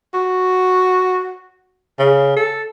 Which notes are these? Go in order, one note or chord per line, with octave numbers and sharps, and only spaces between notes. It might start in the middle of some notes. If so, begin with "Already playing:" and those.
F#4
C#3
A4